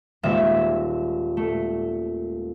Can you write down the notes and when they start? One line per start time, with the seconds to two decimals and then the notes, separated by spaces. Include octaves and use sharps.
0.23 D#1 A#2 G#3 E5 B6
1.37 A3